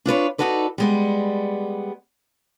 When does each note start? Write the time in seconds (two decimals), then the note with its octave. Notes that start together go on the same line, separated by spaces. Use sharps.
0.06 D4 F4 B4 C#5
0.38 D#4 F4 F#4 A4 B4 D5
0.78 G3 G#3 B3